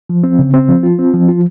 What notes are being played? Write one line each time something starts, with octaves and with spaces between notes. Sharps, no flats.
F3
C4
C#3
C4
F3
F4
C4
F3
F4